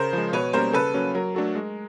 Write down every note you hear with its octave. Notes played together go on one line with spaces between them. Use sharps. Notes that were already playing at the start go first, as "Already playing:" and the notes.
Already playing: C#3 A#4 C5
F3 G#3
B2 B4 C#5
G3 A#3 C#4 A#4 C5
C#3 A4 B4
F#3 A#3 C#4
F#3 A#4
A3 D4 F#4 A4
G#3